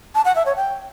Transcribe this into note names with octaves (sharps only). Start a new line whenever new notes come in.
A5
F#5
E5
C#5
G5